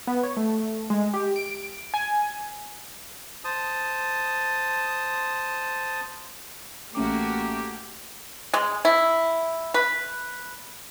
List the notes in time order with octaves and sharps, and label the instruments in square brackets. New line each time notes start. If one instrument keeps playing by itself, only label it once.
[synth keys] B3
C#5
A3
G#3
G4
D7
G#5
[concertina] C5 A5 D#6
[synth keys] A1 C#4 D6 [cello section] A3 [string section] A#3 F#4 [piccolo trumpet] G4
[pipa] G#3
E4
B4